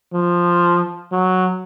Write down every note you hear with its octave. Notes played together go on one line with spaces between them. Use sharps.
F3
F#3